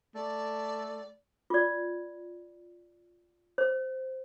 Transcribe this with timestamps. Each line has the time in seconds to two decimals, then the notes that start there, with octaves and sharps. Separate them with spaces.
0.15 A3 D5
1.50 F4 D5
3.58 C5